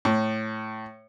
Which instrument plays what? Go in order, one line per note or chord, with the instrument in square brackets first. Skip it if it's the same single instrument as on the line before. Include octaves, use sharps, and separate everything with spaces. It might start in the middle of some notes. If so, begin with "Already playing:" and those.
[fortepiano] A2